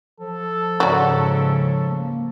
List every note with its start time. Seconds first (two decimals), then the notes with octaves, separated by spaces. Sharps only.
0.20 F3 A4
0.80 G#2 C#3 F#3 D5
1.90 A#3